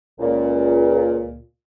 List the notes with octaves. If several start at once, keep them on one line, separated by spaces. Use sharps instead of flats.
C#2 A#2